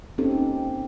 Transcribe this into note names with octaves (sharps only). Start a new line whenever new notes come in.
A#3 C4 C#4 D#4 G4 A4